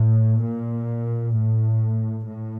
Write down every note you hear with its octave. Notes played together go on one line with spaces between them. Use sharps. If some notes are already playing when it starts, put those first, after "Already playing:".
Already playing: A2
A#2
A2
A2